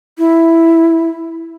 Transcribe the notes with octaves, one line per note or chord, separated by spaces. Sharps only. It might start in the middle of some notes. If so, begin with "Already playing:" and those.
E4